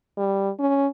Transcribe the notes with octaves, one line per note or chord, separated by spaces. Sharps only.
G3
C#4